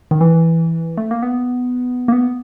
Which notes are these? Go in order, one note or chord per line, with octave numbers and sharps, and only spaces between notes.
D#3
E3
A3
A#3
B3
A#3
B3